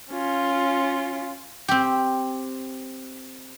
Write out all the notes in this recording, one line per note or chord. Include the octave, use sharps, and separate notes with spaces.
C#4 F4
C4 G4